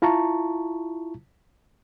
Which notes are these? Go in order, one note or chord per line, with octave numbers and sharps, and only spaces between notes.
E4 F4 A5 A#5 C#6